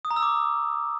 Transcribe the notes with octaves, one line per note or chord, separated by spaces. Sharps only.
D#6
A#5
E6
D6